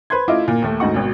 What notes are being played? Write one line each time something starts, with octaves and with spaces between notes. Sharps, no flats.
B4 C5 C6 G#6
A3 E4 F4 D#5 D6
A#2 A#4
D#2 A3
D2 G#2 D#4 F#4 F#5 C#6
G#1 B2